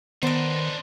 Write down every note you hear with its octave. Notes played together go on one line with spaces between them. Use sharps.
D#3 B3 D4 D#4 A#4 C5